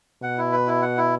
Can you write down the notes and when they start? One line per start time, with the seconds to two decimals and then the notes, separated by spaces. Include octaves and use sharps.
0.23 B2 F#5
0.38 E4
0.52 B4
0.67 E4
0.82 F#5
0.97 E4